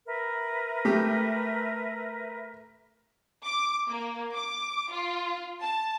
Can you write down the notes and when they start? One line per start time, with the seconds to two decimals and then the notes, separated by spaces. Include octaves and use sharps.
0.07 A#4 B4 E5
0.85 A3 G4
3.44 D6
3.89 A#3
4.35 D6
4.91 F4
5.61 A5